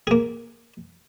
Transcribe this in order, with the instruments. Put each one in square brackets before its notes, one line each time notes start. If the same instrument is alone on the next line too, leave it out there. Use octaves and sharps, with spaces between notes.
[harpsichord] A#3 G#4